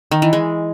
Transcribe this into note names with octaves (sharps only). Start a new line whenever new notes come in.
D#3
E3
G#3